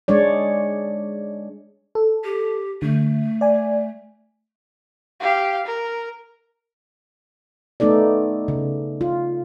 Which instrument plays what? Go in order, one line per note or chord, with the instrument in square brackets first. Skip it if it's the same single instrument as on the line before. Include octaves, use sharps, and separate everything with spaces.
[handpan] G#3 D4 C#5 D5
[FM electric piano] A4
[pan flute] G4
[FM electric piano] D3 [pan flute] A3
[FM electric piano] D5 G#5
[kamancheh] G4 F5
A#4
[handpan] A3 B3 D#4 A4 D5
C#3
F4